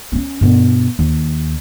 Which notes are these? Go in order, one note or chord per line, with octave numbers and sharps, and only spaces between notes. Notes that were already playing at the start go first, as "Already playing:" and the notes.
C4 C#4
G2 B2
D#2